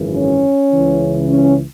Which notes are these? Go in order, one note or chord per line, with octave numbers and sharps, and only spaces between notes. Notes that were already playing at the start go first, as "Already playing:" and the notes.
Already playing: G#1 F#2 C#3 E3
C#4
C#2 C#3 E3
C#4